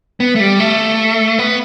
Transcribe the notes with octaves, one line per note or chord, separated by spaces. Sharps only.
B3
A3
G3
A3
B3